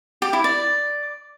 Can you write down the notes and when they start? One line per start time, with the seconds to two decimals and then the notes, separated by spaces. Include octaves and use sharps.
0.22 G4
0.33 E4
0.44 D5